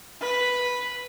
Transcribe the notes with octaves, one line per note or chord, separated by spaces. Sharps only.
B4